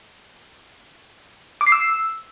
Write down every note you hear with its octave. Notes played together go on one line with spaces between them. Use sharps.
D6
C7
E6